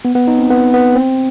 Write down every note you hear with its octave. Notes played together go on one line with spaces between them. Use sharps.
B3
B3
D#4
C4
B3
B3
C4